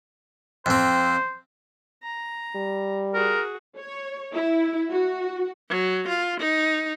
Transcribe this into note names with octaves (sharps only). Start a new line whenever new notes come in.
F2 C4 C5
A#5
G3
F#4 G#4 A#4
C#5
E4
F#4
F#3
F4
D#4